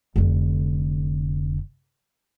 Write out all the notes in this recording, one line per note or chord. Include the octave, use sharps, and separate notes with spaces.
F1 D3